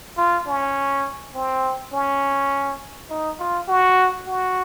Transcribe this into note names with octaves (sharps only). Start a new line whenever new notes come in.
F4
C#4
C4
C#4
D#4
F4
F#4
F#4